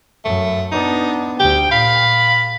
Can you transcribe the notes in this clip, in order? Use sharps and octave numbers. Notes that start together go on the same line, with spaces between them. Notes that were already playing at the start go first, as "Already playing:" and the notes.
F#2 A3
B3 D4 D#4
D2 G4 G5
A#2 F5 B5